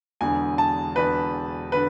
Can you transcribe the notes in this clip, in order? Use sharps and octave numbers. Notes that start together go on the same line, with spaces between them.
E1 E2 D3 G#5
A5
E1 E2 D3 B4
D3 B4